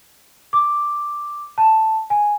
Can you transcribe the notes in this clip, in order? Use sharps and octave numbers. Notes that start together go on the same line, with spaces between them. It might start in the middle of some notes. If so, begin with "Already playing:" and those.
D6
A5
G#5